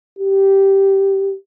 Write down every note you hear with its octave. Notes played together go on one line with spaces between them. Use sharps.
G4